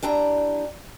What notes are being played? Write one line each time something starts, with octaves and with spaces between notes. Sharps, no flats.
G3 D4 E4 A#5